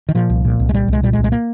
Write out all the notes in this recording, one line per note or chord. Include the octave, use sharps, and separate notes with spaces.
D#3
A#2 F3
C2
A#2
C2
G#3
A#2 G3
C2 G#3
A#2 G3
G#3
C2
G#3
A#3